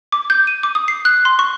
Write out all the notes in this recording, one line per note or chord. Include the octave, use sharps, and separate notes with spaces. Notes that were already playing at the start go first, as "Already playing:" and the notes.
D6
G6
D#7
D6
D#6
C7
F#6
C6
C#6